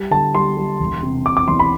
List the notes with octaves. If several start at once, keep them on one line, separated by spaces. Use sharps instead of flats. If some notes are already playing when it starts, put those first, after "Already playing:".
Already playing: G3
D3 A5
G3 C6
G3
E1
C3
C3 D6
D6
E2 C6
B5